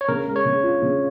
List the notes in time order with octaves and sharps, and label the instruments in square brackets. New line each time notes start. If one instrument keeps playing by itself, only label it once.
[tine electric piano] C#5
[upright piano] C#3 [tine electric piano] A#4
[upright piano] G#3
[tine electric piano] C#5
[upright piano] C#3
F4
C#3